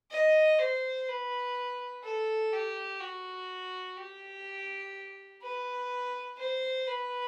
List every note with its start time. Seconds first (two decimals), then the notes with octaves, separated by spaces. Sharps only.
0.11 D#5
0.59 C5
1.08 B4
2.03 A4
2.53 G4
3.00 F#4
3.97 G4
5.42 B4
6.37 C5
6.87 B4